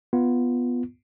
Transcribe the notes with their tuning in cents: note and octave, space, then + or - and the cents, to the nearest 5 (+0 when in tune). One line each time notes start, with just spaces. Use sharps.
B3 +0 F4 +0